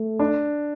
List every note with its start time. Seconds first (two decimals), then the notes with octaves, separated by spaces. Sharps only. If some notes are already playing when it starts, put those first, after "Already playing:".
Already playing: A3
0.19 D4